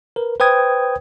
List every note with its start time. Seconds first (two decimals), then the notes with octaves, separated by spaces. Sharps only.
0.16 A#4 B4
0.40 B4 C5 G5 D#6 G#6